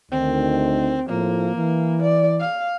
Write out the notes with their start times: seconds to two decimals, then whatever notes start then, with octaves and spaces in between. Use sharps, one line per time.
0.12 D2 D#3 C4
1.10 A2 F3 A#3
1.57 E3
2.02 D5
2.40 F5